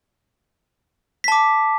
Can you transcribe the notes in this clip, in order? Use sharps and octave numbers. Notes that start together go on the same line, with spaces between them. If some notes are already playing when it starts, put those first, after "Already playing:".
A5 D6 B6